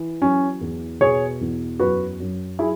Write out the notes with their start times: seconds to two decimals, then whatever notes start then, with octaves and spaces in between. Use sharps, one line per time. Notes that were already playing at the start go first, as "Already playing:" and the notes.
Already playing: E3
0.21 F#3 C#4
0.61 E2
1.01 B2 G#4 C#5
1.41 E2
1.79 F#2 F#4 B4
2.20 F#2
2.59 F#3 E4 G#4